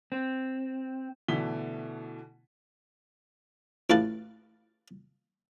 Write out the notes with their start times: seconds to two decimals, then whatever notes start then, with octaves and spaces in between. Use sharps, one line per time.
0.12 C4
1.28 B2 D3 E3 A3 B6 G7
3.90 A1 A2 G4 B4 F5 A5